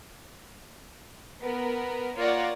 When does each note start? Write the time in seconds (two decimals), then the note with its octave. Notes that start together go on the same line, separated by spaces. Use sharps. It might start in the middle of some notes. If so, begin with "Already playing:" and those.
1.43 B3 A#4
2.18 A#3 F4 C#5 D5 F#5 A#6